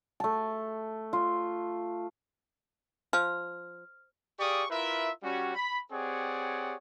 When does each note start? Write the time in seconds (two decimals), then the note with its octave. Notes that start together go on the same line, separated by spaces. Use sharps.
0.20 A3 A5
1.13 F4
3.13 F3 F6
4.39 G4 G#4 D5 F5 C#6 D#6
4.70 E4 F4 A#4 B4 E5
5.23 G3 C#4 F#4
5.55 B5
5.92 C4 G4 G#4 C#5 D5 F#5